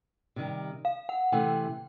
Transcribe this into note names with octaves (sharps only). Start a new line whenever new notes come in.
C3 D#3 G3
F5
F#5
C3 E3 A3 G5